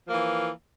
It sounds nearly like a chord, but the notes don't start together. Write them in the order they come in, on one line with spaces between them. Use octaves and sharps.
F3 A#3 E3